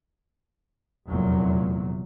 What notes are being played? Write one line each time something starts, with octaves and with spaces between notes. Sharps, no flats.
F1 E2 A#2 F#3